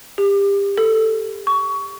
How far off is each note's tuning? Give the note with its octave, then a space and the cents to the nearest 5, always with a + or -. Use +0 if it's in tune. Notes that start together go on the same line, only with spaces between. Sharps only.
G4 +30
A4 +10
C#6 +20